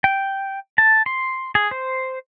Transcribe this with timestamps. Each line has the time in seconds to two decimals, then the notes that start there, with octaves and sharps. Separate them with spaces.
0.04 G5
0.78 A5
1.06 C6
1.55 G#4
1.71 C5